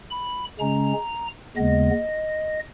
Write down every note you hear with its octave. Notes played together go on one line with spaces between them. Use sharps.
B5
C#3 G#3 C#4 A#5
D#2 C#3 G#3 B3 D#5